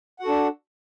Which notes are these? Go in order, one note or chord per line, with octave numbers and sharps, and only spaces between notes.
D4 F#4 A4 F#5